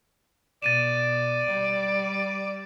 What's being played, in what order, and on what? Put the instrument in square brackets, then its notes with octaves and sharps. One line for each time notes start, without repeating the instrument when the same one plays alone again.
[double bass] B2 [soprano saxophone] D5 [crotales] A6 D#7 E7
[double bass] G3